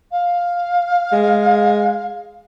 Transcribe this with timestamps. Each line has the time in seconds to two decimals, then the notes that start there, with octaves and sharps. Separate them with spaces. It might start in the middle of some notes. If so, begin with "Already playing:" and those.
0.11 F5
1.12 G#3